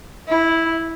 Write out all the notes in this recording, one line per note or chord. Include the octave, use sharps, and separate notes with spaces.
E4